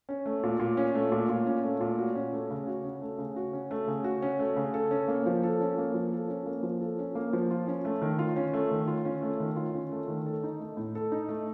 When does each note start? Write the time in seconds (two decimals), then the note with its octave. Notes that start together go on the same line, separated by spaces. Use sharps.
0.09 C#4
0.26 A3
0.43 A#2
0.59 A#2
0.77 C#4
0.95 A3
1.12 A#2
1.29 A#2
1.47 C#4
1.64 A3
1.81 A#2
1.99 F#4
2.15 C#4
2.33 A3
2.50 C#3
2.67 F#4
2.84 C#4
3.02 A3
3.18 C#3
3.36 F#4
3.53 C#4
3.71 A3
3.87 C#3
4.04 F#4
4.22 C#4
4.39 A3
4.56 C#3
4.74 A4
4.91 C#4
5.08 A#3
5.26 F3
5.43 A4
5.61 C#4
5.78 A#3
5.94 F3
6.12 A4
6.29 C#4
6.46 A#3
6.63 F3
6.80 A4
6.99 C#4
7.15 A#3
7.33 F3
7.50 F4
7.67 C#4
7.85 A3
8.02 D#3
8.19 F4
8.36 C#4
8.54 A3
8.71 D#3
8.87 F4
9.05 C#4
9.22 A3
9.40 D#3
9.56 F4
9.74 C#4
9.92 A3
10.08 D#3
10.26 A4
10.44 D#4
10.60 A3
10.77 A2
10.95 A4
11.12 D#4
11.29 A3